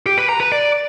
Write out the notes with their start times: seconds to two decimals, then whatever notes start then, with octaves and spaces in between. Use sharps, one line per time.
0.06 G4
0.18 B4
0.29 A#5
0.40 B4
0.52 D5